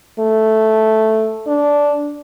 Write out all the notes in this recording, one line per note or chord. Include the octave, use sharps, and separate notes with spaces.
A3
D4